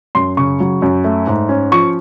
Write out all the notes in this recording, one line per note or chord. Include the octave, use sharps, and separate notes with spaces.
F#2 C6
C#3 C#6
F#3
F#2
A3
G#2
C#4
F3 C#6